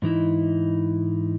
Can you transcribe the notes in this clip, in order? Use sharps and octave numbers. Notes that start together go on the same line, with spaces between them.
G#2 E3 D#4 E4